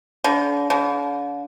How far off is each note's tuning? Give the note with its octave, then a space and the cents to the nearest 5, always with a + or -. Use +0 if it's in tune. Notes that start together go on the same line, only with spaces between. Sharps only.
D3 -40
D3 -45